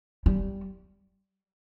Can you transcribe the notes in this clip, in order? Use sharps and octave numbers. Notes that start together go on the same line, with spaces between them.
G3